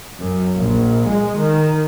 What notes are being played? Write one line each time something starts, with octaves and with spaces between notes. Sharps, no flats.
F#2
A#1
G#3
D#3